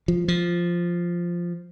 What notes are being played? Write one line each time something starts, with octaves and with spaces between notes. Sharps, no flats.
F3
F3